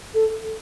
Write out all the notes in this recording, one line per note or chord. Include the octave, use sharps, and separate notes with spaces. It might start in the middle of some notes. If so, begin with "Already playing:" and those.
A4